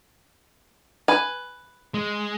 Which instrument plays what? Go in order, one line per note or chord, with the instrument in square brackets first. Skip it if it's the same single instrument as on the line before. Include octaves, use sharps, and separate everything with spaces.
[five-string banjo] B4 G#5
[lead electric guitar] G#3